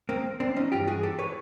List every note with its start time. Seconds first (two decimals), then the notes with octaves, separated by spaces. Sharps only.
0.09 A#3 C4
0.40 C4 D4
0.56 C#4 D#4
0.72 G2 E3 F4 G4
0.87 F#4 G#4
1.03 G4 A4
1.19 B4 C#5